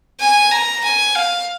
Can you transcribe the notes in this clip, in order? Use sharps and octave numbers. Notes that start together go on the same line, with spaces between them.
G#5
A#5
G#5
F5